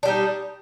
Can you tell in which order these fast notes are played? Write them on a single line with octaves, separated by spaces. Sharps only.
D4 G3 D#4